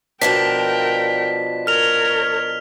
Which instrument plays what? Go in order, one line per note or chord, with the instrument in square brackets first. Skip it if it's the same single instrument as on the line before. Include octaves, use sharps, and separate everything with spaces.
[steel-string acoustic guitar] B2 F3 D4 [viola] A#4 G5 [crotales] B6
[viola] A#4 C#5 [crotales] F6 F7